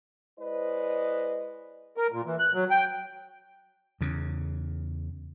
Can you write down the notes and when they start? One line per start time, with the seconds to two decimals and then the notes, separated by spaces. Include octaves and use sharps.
0.39 G#3 E4 B4 C5 D5 D#5
1.97 A#4
2.12 A#2
2.26 E3
2.39 F#6
2.54 F#3
2.71 G5
4.01 E2 C#3